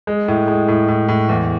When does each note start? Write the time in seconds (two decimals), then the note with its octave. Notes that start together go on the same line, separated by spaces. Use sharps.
0.07 G#3
0.28 A2
0.48 G#3
0.68 A2
0.88 A2
1.08 A2
1.29 E2